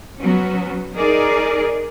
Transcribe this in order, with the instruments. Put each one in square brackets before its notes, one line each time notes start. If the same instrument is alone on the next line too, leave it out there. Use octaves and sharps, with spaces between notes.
[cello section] F#3 B3 C#4 F#4
D#4 G#4 A#4 D5